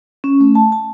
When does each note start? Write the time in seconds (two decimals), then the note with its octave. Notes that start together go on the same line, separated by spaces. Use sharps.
0.24 C#4
0.40 A3
0.55 A5
0.72 A5